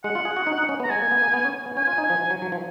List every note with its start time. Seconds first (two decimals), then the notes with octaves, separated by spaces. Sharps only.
0.04 G#3 F#5
0.15 F4
0.25 G#4
0.36 F#4
0.47 D#4
0.58 D#4
0.69 C#4
0.80 B3
0.84 A#5
0.90 G#3 G#5
1.02 A#3
1.11 B3
1.22 A#3
1.33 B3
1.45 C#4
1.66 B3
1.77 C#4 G#5
1.88 F4
1.98 D#4
2.10 F3
2.20 F#3
2.30 F#3
2.42 F#3
2.52 F3